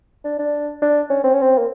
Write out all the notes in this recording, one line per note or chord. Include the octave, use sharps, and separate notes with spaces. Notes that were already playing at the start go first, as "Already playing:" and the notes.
D4
D4
D4
C#4
C4
C#4
C4
A#3